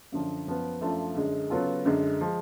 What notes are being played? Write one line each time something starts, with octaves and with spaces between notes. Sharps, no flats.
F#2 D3 F3
F#2 F3 B3
F#2 F3 A3 D4 F4
F#2 D3 G#3
C#3 F#3 B3 F4 A4
F#2 D3 G#3
F3 G#3